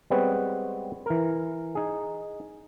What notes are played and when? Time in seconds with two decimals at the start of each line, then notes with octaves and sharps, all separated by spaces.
0.10 G3 G#3 B3 C4 B4 C#5
1.06 E3 A#4
1.75 D#4 G#4